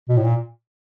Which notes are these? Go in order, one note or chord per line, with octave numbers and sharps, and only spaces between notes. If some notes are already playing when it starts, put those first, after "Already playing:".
B2
A2
A#2